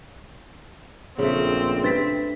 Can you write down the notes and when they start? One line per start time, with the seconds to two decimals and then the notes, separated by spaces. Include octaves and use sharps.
1.19 A#1 C#3 A3 C4
1.83 G2 B4 A6 B6